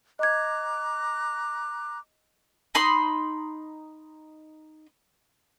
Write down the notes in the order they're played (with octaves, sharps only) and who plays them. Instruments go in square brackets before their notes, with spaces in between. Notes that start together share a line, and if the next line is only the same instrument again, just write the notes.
[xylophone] D#5 G#6 [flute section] A#5 D6 F#6
[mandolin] D#4 B5 C6